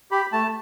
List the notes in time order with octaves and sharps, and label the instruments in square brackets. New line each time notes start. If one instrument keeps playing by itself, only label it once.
[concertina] G4 B5
A3 A5